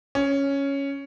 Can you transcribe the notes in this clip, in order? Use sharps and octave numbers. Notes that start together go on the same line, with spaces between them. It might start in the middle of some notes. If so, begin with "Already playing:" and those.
C#4